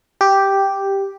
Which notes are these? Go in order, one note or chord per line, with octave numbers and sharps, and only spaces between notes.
G4